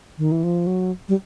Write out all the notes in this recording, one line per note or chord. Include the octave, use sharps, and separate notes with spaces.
D#3
E3
F3
F#3
G3